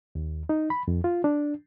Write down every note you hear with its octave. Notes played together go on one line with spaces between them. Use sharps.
D#2
D#4
B5
F2
F4
D4